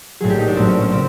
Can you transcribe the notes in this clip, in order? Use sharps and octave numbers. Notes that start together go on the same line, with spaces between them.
A#1 A2 F#3 G#4
G4
D#4
D4
A#1 A2 F#3 C4
C#4
C#4
C#3 C4